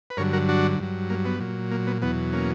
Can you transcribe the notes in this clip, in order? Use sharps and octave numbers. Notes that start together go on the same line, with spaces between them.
B4
G2 D3 F#3 A#4 C#5
F#4 A#4
D4 F#4
G2 F#3
A#3
B3
A#2 F#3
A#3
B3
E2 B2 F#3 B3
A#3 C#4